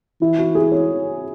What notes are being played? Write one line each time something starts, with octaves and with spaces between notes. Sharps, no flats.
E3 E4
F#4
G#4
C#5